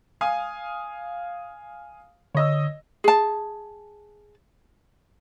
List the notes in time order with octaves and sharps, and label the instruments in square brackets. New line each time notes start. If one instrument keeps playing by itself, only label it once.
[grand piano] F5 G#5 D#6
[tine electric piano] D3 [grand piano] C#5 D#5 E6
[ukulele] G#4 A5